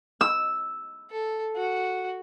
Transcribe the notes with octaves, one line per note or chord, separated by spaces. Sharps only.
E6
A4
F#4